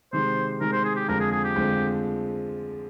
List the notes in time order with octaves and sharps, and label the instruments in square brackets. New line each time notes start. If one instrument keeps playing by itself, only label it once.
[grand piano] C3 D#3 G#3 [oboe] C5
[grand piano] C3 D#3 G#3 [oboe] A#4
[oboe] C5
G#4
G4
[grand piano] F2 D3 F3 G#3 [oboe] A#4
[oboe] G#4
G#4
G4
[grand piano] F2 D3 F3 G#3